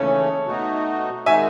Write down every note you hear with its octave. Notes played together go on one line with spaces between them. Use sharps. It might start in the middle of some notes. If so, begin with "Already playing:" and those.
Already playing: D#2 C#3 E3 A3 C#4 A4 C#5
B2 A3 D#4 F#4
D#3 G#3 D#4 F#4 E5 G#5